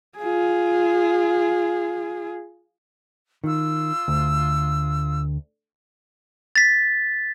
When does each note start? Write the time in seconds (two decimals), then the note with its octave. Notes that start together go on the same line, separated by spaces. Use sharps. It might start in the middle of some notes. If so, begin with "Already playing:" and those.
0.18 F4 G#4
3.44 D#3 F4 E6
4.08 D2
6.56 A6 B6